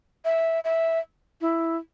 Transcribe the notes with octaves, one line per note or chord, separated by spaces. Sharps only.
E5
E5
E4